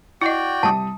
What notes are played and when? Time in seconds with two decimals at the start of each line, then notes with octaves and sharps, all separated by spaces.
0.22 E4 F#4 D5 D#5 G5
0.63 C3 G3 A5 D#6